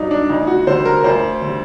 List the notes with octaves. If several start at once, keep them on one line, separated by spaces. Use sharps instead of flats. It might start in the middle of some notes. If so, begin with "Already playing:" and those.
Already playing: G2 F#3 D4 D#4
D4
D2 D#4
F#4
D3 G3 C5
A#4
D2 C5
D3 G3